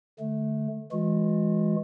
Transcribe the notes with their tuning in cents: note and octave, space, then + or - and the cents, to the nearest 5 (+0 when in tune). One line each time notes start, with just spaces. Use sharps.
D3 +0 A3 -20
E3 +0 G#3 +0 F#4 -40